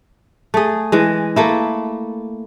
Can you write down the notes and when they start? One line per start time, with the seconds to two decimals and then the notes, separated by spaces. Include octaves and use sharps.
0.54 A3 G#4
0.92 E3 G#3
1.36 A3 A#3 E4